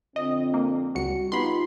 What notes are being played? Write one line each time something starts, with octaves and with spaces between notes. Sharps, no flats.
F2 D3 C4 D#5
A#3
C#2 G3 F#4 C#7
B3 D#4 F4 G4 B5 C6